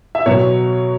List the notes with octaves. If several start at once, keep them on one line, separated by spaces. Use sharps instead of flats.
E5
B2 F#3 C#5